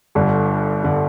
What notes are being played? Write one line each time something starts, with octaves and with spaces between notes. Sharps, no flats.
G1 G2 D3
G1 D3